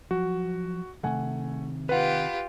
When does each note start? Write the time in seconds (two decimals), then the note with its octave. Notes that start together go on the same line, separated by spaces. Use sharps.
0.11 F3 F#3 F#4
1.03 C3 D#3 A3 F#5 G#5
1.89 F4 G4 B4 F#5